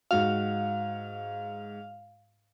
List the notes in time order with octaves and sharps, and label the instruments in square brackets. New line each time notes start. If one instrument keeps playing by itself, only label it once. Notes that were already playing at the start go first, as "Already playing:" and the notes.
[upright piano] G#2 F#4 [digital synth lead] F5